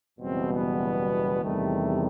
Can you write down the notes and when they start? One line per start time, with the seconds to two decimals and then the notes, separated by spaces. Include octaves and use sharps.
0.19 F#1 E2 B2 G3 C4
0.49 B3
1.42 E2 C3 D#3 G3 A3